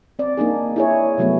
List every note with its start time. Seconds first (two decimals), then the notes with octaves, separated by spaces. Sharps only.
0.19 C4 D5
0.37 A#3 D4 D#4 G#4
0.76 E4 G#4 C#5
1.18 C3 F#3 A3 B3